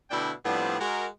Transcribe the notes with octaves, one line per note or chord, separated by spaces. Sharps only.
B2 D3 A3 D4 E4 G5
A2 F3 G3 B3 C4 D4
G#3 F#4 A#4